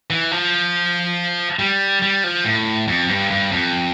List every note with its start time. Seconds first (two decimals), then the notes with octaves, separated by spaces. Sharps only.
0.10 E3
0.32 F3
1.59 G3
2.02 G3
2.24 F3
2.45 A2
2.87 F2
3.09 G2
3.30 G2
3.52 F2